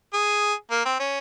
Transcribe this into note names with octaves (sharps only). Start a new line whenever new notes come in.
G#4
A#3
C4
C#4